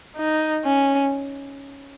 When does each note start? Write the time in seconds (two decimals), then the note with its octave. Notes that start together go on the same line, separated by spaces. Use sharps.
0.17 D#4
0.65 C#4